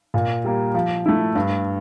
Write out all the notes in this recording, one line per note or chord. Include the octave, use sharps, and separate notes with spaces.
A#2
G3 A#3
F3
A3 E4
G2